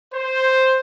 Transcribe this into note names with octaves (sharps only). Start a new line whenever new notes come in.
C5